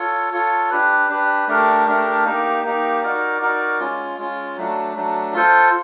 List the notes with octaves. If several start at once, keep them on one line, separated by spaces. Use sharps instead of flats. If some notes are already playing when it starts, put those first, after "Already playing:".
Already playing: F4 A4 C#5
F4 A4 C#5
D4 G4 B4
D4 G4 B4
A3 D4 G4 A#4
A3 D4 G4 A#4
A#3 D#4 G4
A#3 D#4 G4
D#4 F#4 A#4 D5
D#4 F#4 A#4 D5
G#3 C#4 F4
G#3 C#4 F4
F#3 A3 D4
F#3 A3 D4
F4 A4 C5